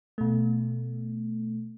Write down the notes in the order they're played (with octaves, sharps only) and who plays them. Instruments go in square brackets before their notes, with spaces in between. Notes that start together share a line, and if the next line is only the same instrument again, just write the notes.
[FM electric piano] B2 A3